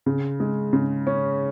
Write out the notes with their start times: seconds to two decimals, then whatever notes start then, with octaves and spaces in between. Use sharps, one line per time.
0.06 C#3
0.40 G#3
0.73 C#3
1.07 C#4